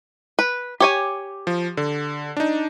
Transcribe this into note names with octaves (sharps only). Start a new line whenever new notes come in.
B4
G4 C#5 G#5
F3
D3
D4 D#4